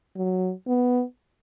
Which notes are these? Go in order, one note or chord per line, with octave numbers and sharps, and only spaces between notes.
F#3
B3